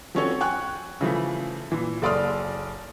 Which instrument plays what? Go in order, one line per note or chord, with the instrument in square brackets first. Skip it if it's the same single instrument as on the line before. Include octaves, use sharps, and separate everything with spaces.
[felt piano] F3 C4 C#4 F#4 A4 C#5
G5 G#5 C#6 F#6
C#3 E3 F3 A3
A#2 E3
F#1 A4 D5 C6 D#6 F6